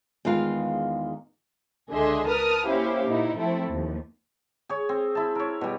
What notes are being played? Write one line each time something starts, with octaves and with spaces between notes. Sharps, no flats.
E2 D#3 G#3 F4 B4 F5
C#2 D3 G#4 D#5 E5 C6
A#4 B4 A5 D#6 F6
A#3 C#4 E4 G4 C5 F5
A#2 D#4 E4
F3 A3 C4 E4
D#2 F3
G#4 C#5
C4
E4 A5
A#4 C#5
B2 G3